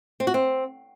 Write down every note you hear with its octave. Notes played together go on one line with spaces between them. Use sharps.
C4
F#4
C4